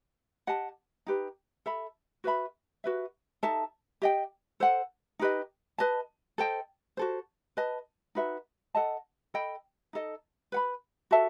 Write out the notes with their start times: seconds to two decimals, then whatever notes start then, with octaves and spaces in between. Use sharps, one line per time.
0.47 G4 D#5 F#5 A5
1.07 D#4 G4 B4
1.66 A4 E5 B5
2.24 F#4 B4 E5 B5
2.84 F#4 B4 E5
3.43 D#4 A4 E5 A5
4.02 G4 D#5 G5
4.60 A4 C5 F#5
5.19 D#4 G4 B4 D#5
5.78 B4 D#5 A5
6.38 A4 C5 D#5 G5
6.97 F#4 A4 C5
7.57 B4 D#5 A5
8.15 D#4 F#4 B4 E5
8.75 A4 D#5 F#5 A5
9.34 A4 D#5 G5 B5
9.93 D#4 A4 D#5
10.52 B4 F#5 B5
11.11 F#4 A4 E5 A5